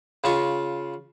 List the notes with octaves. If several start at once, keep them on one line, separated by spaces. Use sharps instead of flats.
C#3 F4 C#6